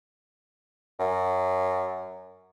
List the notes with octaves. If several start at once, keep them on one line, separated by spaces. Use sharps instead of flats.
F#2